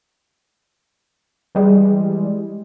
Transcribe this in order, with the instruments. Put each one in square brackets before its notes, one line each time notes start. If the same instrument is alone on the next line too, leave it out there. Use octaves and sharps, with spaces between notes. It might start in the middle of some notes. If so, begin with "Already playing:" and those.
[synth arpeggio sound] E3 G3 G#3